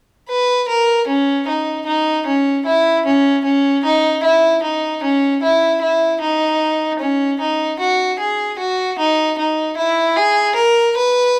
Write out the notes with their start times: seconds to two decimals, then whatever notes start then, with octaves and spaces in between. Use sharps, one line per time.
0.29 B4
0.68 A#4
1.08 C#4
1.47 D#4
1.86 D#4
2.26 C#4
2.65 E4
3.05 C#4
3.44 C#4
3.84 D#4
4.23 E4
4.63 D#4
5.03 C#4
5.42 E4
5.82 E4
6.21 D#4
7.00 C#4
7.40 D#4
7.79 F#4
8.19 G#4
8.59 F#4
8.98 D#4
9.38 D#4
9.77 E4
10.16 G#4
10.56 A#4
10.96 B4